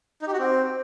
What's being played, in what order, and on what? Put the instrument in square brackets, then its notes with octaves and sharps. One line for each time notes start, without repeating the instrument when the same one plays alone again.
[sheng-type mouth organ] D#4
G4
F#4
C4